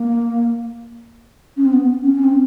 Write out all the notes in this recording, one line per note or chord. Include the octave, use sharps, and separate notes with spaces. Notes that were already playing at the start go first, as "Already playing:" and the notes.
Already playing: A#3
C#4
C4
B3
C#4
C#4
C4